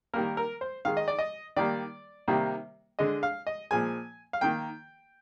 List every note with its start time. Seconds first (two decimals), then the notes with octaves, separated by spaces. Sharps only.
0.14 D#3 G3 A#3 A#4
0.37 A#4
0.61 C5
0.85 D#3 G#3 F5
0.97 D#5
1.08 D5
1.19 D#5
1.56 D#3 G3 A#3 D5
2.28 C3 D#3 G3 A#3
2.99 D3 G#3 D#5
3.23 F5
3.47 D#5
3.71 A#2 F3 G#3 G#5
4.33 F5
4.41 D#3 A#3 G5